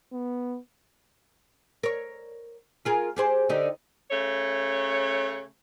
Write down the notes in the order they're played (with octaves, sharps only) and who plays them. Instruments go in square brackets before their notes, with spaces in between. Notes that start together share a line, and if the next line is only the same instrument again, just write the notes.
[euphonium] B3
[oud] A#4 C#5
F4 G#4 A#4
G4 G#4 C5
D3 D#4 G4
[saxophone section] C#3 A3 C#5